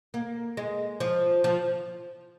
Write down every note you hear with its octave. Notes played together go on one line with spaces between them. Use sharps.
A#3
G#3
F3
F3